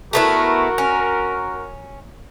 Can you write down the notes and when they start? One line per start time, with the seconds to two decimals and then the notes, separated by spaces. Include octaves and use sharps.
0.13 A3 B3 E4 F#4 A#4
0.78 C#4